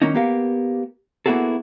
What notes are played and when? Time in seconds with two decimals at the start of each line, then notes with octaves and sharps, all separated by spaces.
0.02 D#3 A#3 C#4 D#4
0.14 A#3 B3 G4 A#4 F5
1.26 A#3 B3 E4 F#4 G#4 A4